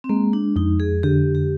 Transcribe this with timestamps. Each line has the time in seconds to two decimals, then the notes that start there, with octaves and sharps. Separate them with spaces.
0.04 C4
0.09 G#3 A#3
0.33 D4
0.56 F2 D#4
0.80 G#4
1.03 D3 G4
1.35 G4